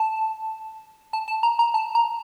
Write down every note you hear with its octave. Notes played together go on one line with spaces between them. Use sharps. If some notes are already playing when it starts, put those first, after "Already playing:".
Already playing: A5
A5
A5
A#5
A#5
A5
A#5